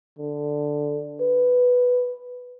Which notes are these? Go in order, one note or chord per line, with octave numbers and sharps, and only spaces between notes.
D3
B4